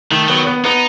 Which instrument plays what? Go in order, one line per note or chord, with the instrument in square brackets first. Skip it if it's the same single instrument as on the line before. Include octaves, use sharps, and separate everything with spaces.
[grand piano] D#3 [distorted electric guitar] A3
[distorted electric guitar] F#3 [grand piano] B3
[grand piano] B3
[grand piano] B3 [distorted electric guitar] D#4